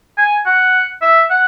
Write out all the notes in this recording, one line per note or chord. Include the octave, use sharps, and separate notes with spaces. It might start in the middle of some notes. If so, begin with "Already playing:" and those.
G#5
F#5
E5
F#5